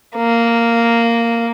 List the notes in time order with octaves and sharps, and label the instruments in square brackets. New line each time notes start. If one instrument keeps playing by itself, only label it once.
[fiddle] A#3